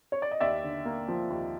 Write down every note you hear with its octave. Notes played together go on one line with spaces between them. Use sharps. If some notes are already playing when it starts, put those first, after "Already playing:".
C#5
D5
D#5
D#2 D5 E5
D3
A#3
F3
D#2